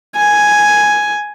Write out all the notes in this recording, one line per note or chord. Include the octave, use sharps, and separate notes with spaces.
G#5